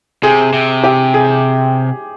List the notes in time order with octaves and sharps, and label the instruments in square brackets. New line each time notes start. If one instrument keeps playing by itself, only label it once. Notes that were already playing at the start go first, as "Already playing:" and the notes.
[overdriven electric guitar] C3 [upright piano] G#4
[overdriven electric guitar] C3
[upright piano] G4
G#4